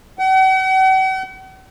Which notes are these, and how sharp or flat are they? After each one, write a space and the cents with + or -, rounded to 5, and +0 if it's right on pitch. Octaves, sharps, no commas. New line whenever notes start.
F#5 +45